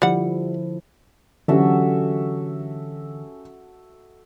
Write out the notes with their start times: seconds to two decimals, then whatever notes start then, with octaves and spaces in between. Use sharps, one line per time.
0.02 D3 F3 G3 E4 F#5
1.48 D3 E3 F#3 C#4 F#4 G4 A4 E5